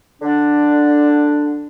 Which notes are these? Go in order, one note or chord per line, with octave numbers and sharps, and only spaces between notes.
D3 D4